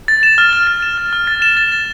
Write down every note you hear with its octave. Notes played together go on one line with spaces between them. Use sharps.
A6
E7
F6
F6
A6
E7
F6
F6
A6
E7
A6
A6